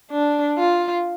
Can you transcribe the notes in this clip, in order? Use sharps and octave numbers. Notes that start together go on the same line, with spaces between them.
D4
F4